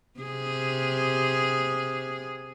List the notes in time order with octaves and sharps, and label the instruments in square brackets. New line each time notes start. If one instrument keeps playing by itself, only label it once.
[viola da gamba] C3 G#4